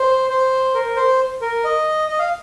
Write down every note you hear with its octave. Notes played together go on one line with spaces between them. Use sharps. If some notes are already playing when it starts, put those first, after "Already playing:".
Already playing: C5
C5
A#4
C5
A#4
D#5
D#5
F5